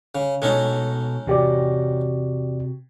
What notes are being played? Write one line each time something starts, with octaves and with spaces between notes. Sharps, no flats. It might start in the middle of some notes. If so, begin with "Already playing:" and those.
C#3
B2 G#3 C#4 D#4 A4 C#5
E2 C3 F#4 G4 D5